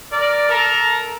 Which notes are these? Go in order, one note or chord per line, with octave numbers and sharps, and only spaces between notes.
A#4 D5
A4 A#4 A#5